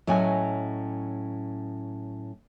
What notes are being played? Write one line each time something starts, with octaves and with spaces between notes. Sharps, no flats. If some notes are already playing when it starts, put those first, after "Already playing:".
A2 F#3 C#4 D#5 G#5